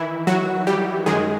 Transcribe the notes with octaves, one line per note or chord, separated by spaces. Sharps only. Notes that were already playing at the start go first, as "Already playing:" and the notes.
Already playing: D#3 E3 E4
F#3 F#4
G3 G4
F#2 D#3 G#3 G#4